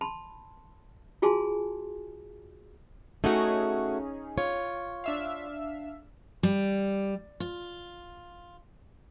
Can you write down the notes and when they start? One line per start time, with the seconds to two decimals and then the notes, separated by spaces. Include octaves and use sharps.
0.01 A5 B5 C6
1.22 F4 F#4 G#4 G#5 A5 C6
3.24 A3 C#4 D#4 F#4 G#4
4.38 F4 C#5
5.04 D4 E5 F5
6.43 G3
7.40 F4